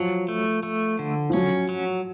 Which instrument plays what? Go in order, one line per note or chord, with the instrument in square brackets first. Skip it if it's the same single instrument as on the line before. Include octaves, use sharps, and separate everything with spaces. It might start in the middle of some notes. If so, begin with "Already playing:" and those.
Already playing: [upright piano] F3 [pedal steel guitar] F#3
[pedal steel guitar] A3
A3
D3
[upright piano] F3
[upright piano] F#3 [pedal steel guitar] C#4
[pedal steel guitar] F#3